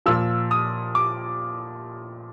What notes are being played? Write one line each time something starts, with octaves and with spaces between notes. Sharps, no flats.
A#2 F3 E6
D#6
D6